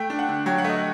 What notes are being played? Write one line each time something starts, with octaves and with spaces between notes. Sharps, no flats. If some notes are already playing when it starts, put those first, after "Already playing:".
Already playing: A3 G5
D4
F#5
D3
F#3 G5
F#5
A3 D#5